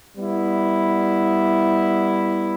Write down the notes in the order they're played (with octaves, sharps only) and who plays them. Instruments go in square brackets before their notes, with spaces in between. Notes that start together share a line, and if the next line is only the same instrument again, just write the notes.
[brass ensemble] G3 B3 E4